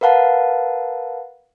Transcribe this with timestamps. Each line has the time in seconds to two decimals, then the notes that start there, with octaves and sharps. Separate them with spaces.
0.01 A#4 B4 F5 F#5 A5